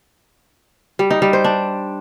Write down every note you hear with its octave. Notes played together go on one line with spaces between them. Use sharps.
G3
D#4
G3
C5
D4